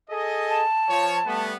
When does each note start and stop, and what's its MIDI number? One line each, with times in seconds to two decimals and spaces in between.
0.10 0.64 68
0.10 0.64 69
0.10 0.64 75
0.49 1.44 81
0.90 1.20 53
0.90 1.20 73
1.26 1.55 55
1.26 1.55 57
1.26 1.55 59